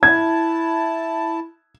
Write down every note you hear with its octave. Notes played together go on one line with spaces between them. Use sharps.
E4 A5 G#6